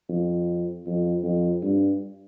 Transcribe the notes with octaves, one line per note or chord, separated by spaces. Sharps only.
F2
F2
F2
G2